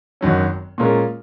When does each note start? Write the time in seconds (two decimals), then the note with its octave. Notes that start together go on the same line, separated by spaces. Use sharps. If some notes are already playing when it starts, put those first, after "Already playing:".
0.21 G#1 F#2 D#3 F#3 C#4
0.78 A#2 G#3 C#4 F4 A#4